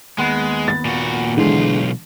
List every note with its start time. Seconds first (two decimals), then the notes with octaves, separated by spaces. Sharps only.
0.18 D#2 G#3 B3
0.68 A6
0.85 A#2 F#4
1.37 B1 D3 E3 G#3 F4